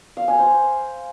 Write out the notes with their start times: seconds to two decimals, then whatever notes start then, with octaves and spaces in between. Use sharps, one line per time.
0.17 F5
0.28 G#5
0.39 C5